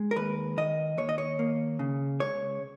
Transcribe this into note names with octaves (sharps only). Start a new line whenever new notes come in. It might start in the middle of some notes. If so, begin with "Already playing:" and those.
Already playing: G#3
A#4
D#2 B4
D#3 D#5
D#2 C#5
D#5
C#5
A#3
C#3
C#2 C#5